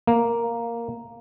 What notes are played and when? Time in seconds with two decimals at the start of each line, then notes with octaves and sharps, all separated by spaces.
0.07 A#3